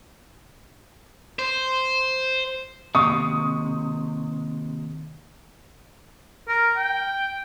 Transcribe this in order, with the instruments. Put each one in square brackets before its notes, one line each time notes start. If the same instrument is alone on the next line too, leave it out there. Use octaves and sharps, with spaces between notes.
[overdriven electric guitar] C5
[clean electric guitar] D#2 C3 [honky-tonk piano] C#6 D#6
[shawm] A#4
G5